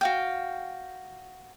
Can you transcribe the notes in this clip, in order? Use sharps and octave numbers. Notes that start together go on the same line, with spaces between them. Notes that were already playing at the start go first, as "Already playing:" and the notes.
F#4 F5 G5